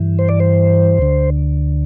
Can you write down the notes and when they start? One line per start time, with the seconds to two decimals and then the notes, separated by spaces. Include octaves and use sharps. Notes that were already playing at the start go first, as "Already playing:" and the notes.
Already playing: G2 E3
0.19 C5
0.29 D5
0.40 C5
0.98 D2 D3